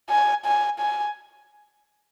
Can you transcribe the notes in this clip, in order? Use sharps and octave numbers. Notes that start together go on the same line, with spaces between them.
G#5
G#5
G#5